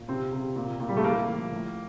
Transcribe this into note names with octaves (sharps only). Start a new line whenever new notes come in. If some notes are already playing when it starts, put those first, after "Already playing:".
Already playing: A#2
C3 C4
C3
A#2
A#2
G3
A3
A2 A#3
F3
A2